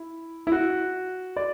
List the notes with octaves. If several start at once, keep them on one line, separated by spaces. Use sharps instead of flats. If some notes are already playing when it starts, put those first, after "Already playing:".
Already playing: E4
E4
F#4
D5